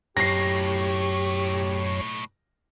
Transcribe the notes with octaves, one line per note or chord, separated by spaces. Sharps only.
B1 F#2 A2 G4 C#5 A#6 C7